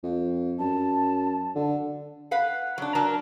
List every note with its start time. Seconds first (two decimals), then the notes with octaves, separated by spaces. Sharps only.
0.03 F2
0.59 F#2 A5
1.56 D3
2.31 B4 F5 F#5
2.78 F#3 D4
2.95 F#3 D4 A#4 A5